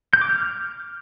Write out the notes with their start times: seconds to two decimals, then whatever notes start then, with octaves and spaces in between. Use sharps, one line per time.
0.13 G6
0.21 D6
0.29 F6